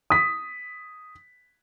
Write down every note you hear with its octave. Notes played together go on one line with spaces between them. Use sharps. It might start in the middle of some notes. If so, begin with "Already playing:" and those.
D#6 B6